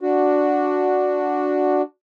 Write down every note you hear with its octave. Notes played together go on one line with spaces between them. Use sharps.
D4 F#4